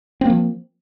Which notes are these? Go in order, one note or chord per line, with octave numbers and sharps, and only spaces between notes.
F3 A#3 C4